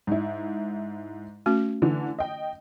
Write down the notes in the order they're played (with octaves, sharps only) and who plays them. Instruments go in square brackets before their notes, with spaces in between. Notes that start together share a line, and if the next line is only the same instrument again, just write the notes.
[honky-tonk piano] G#2 E4
[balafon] A3 C#4 F#4
[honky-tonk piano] D3 E3
D#5 G5